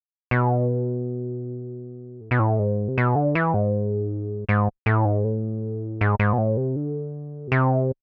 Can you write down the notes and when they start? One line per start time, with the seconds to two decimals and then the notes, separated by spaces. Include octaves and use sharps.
0.31 B2
2.21 A2
2.31 B2
2.39 A2
2.59 G#2
2.88 C3
2.98 B2
3.15 D3
3.35 E3
3.54 G#2
4.49 G#2
4.86 A2
5.05 G#2
5.24 A2
6.01 G#2
6.20 G#2
6.33 B2
6.38 A2
6.57 C3
6.76 D3
7.47 B2
7.52 C3